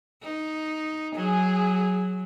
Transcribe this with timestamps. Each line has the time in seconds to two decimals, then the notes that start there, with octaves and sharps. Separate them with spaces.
0.23 D#4
1.16 F#3 G#4